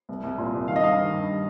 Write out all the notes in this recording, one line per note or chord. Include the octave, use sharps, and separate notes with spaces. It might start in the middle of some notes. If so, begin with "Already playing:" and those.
C2
C2
A#2
C2
D#3 F5
D#5
G2 F5
D#3
G2